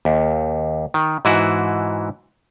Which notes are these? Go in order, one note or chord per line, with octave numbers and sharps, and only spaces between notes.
D#2
D#3
G#2 E3 E4 F#4